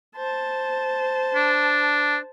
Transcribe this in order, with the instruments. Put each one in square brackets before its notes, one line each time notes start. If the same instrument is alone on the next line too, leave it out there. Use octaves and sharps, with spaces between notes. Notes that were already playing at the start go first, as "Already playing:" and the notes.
[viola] C5 A5
[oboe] D4